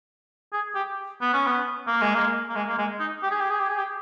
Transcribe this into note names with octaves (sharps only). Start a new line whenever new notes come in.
G#4
G4
B3
C#4
B3
A#3
G#3
A#3
A#3
G#3
A#3
G#3
D#4
G4
G#4
G4
G#4
G4
G#4
G4